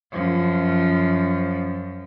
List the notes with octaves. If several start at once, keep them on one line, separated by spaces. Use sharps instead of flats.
F#2 F3